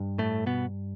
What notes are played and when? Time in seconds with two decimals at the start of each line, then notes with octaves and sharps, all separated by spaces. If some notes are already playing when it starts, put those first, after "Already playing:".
Already playing: G2
0.18 A2 A3
0.46 B2 B3